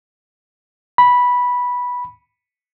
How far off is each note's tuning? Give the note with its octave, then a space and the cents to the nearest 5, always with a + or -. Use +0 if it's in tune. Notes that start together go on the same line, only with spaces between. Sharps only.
B5 -10